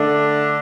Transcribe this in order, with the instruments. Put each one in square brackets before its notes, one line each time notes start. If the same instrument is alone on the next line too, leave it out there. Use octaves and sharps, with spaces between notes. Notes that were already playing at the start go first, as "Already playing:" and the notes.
Already playing: [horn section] D3 A3 D4